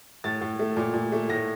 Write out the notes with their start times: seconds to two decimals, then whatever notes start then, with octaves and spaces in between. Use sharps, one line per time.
0.24 A2 A6
0.41 A2
0.59 A3
0.76 A#2
0.94 A#2
1.12 A3
1.29 A2 A#6